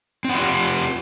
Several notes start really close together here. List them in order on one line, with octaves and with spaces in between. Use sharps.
C4 F#5 F4 G4